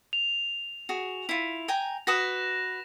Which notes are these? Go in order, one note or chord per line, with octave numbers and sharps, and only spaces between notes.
F7
F#4 G#4
E4 F4
G5 G#5 A#5
F#4 B4 D#6 A#6 E7